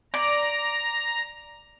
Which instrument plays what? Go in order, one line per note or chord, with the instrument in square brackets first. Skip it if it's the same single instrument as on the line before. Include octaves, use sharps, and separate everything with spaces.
[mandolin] D5 [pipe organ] A#5